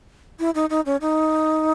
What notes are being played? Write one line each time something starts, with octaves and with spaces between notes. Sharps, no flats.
E4
D#4
D#4
C#4
D#4